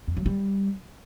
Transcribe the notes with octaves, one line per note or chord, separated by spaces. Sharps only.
F2
F#3
G3